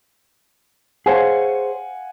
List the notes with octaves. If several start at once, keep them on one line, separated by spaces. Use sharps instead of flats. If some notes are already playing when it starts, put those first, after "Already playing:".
G#4 C5 C#5 F5 F#5 G#5